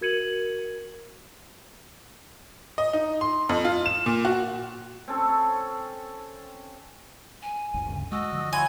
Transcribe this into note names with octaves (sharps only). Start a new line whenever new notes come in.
F#4 A#4 G#6 C#7 D#7 F#7
D#5
D#4
C6
F2
F4
E7
A#2
F#4
C4 C#4 A4 C#5
G#5
G1 D2
D2 G2 C#3
G#3 F#4 D#5 E6
D3 F3
E4 F#4 C#5 G#5 C6